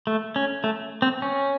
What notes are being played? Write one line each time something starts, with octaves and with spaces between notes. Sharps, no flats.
A3
C#4
A3
C4
C#4